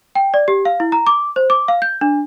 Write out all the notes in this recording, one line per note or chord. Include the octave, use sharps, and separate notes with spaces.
G5
D5
G4
F5
E4
A#5
D6
C5
D6
F5
G6
D4